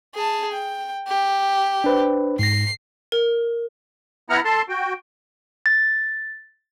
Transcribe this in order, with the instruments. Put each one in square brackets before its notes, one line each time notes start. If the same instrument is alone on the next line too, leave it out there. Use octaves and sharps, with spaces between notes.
[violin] G#4 A5
G5
G4
[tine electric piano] D4 B4 C5
[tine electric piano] G#2 A#6 [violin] C7
[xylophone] A#4
[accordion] B3 E4 F#5 A#5 F6
A4 A5 C6
F#4 G5
[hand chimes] A6